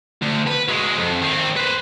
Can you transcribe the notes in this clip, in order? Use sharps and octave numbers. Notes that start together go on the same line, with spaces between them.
D2
B4
F#3 G#3
F2
D#3 C4
B4 C5